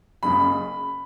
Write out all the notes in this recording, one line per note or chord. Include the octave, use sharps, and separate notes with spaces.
F#1 F#2 C#3 B5